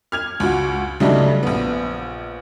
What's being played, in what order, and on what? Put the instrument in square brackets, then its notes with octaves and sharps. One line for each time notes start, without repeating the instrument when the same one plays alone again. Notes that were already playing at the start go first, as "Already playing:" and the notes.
[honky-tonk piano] F6 G#6 F7
C#2 F#4
C#3 F#3 G3 A3 D4 D#4
A#1 B3